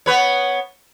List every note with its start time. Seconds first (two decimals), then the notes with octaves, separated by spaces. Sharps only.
0.06 B3 B4 C#5